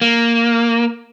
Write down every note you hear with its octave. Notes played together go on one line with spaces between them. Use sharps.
A#3